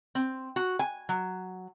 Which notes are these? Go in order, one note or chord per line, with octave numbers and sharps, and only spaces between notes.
C4
F#4
G#5
F#3